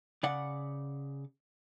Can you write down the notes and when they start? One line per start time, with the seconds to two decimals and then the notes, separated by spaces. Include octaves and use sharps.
0.23 C#3 D5 F#5